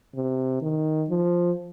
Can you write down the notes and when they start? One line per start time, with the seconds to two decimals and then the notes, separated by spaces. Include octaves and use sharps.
0.15 C3
0.62 D#3
1.09 F3